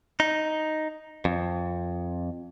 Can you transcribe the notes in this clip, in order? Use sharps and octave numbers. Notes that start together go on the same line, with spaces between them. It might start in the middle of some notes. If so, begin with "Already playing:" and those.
D#4
F2